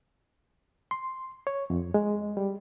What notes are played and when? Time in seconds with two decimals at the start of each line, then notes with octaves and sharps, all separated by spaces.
0.91 C6
1.47 C#5
1.70 F2
1.94 G#3
2.37 G3